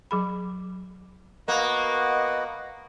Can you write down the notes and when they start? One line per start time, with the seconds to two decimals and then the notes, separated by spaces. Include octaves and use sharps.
0.11 F#3 G#4 B5
1.48 A#3 B3 F#4 D#5 F#5